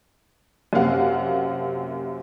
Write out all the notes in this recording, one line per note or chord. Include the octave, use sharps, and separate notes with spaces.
F#2 C3 A#3 C4 F5 F#5